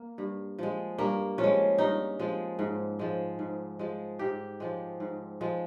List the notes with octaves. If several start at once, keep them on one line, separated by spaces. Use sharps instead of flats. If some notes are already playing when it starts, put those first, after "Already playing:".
Already playing: A#3
G2
F3 G#3
G2 A#3
F3 C#4
G#3
G2 D#4
F3 G#3
G#2
F3 G#3
G#2
F3 G#3
G#2 G4
F3 G#3
G#2
F3 G#3